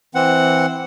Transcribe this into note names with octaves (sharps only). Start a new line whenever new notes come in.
E3 C4 F#5